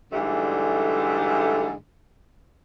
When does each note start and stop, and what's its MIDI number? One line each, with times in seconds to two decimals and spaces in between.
0.12 1.72 44
0.12 1.72 50
0.12 1.72 52
0.12 1.72 55
0.12 1.72 57